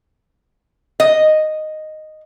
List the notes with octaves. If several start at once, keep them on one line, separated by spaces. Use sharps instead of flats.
D#5